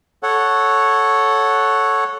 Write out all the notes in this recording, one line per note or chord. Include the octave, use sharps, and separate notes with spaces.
A4 C#5 F#5